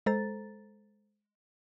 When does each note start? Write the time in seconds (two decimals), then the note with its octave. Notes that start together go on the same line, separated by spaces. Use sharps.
0.06 G#3 A4 C5 A#5 A6